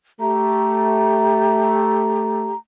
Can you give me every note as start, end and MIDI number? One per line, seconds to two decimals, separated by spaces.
0.20 2.53 57
0.20 2.52 67
0.20 2.56 82